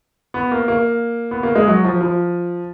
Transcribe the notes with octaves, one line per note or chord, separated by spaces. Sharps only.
B3
A#3
A#3
B3
A#3
G#3
F#3
F3
F3